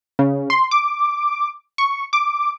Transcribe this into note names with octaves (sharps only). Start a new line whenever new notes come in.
C#3
C6
D6
C#6
D6